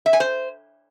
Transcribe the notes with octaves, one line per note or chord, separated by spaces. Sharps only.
E5
G#5
C5